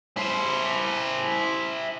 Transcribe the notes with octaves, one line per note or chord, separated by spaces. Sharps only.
E4 C5